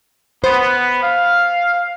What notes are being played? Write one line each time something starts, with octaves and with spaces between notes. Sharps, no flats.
B3 C5
F5